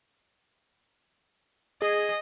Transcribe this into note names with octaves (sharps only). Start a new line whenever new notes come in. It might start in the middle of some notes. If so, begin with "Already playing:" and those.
G#4 D#5